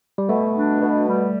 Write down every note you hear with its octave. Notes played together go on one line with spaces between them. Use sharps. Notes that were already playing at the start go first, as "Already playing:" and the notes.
G3
B2 A3
D4
B2
G3